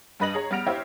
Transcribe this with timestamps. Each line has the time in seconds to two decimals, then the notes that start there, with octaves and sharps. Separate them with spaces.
0.20 G2 G3 B4 D#5 A#6 F#7
0.34 G#4 C#5 A#5
0.51 G3 B3 F6 A#6 D7 F7
0.67 E4 G4 C5 C#5 E5 F5